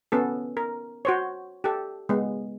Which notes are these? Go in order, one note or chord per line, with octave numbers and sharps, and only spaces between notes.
B3 C#4 A4
A#4
F#4 C5 C#5
G4 A4
G#3 B3